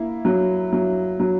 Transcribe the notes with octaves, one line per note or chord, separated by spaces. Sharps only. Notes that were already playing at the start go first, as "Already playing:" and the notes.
Already playing: A#3 E4
F#3
F#3
F#3